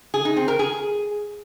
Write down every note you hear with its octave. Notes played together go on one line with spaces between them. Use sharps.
G#4
D#4
C4
A#4
G#4